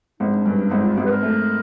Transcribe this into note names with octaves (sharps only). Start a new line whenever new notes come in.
G#1 D#4
D4
G2 C#4
D4
G#1 D#4
F4
G#1 G4
B4
A#4
A3